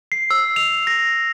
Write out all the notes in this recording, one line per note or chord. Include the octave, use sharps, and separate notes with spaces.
C7
E6
F7
A#6